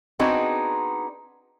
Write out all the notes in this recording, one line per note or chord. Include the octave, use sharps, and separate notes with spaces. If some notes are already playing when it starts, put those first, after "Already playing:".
B3 C4 D4 D#4 F#4 G#4